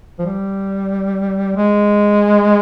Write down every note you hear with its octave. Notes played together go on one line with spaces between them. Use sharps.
F3
G3
G#3